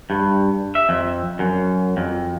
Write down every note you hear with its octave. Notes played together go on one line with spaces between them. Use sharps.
G2
E5
F2
F#2
F2